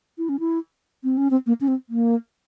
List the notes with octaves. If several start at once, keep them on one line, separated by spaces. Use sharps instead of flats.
E4
C#4
E4
C4
C#4
C4
A#3
C#4
C4
A#3